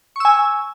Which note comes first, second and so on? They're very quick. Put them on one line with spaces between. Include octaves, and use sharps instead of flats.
C#6 E6 G#5